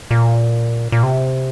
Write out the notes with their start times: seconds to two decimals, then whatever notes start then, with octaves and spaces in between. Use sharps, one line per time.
0.11 A#2
0.92 A#2
1.03 C3